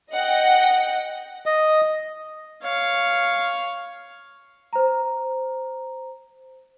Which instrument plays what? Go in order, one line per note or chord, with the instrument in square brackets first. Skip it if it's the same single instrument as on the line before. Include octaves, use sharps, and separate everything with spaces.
[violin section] D#5 F#5 G5
[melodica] D#5
[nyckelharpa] C#5 F5
[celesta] C5 A#5